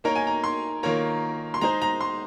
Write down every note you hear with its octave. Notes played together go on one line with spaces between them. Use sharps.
A#3 D#4 A#4 C#5 A#5
G#5
A#5
C6
D#3 A#3 F4 A#4 C#5 A#5
C6
G#3 D#4 G#4 C5 A#5
A#5
C6